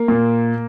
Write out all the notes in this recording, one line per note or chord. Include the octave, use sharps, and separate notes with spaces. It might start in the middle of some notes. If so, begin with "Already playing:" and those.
Already playing: A#3
A#2